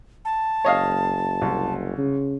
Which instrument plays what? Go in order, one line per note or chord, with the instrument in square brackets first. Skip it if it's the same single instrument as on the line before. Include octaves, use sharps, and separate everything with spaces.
[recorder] A5
[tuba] F#1 [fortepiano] C#5 D#5 F5
[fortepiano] C2
[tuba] C#3